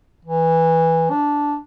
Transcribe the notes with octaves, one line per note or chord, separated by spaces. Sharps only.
E3
D4